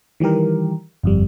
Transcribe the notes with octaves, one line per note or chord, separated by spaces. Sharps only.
D#3 E3 G3 G4 A#4
G1 F2 G3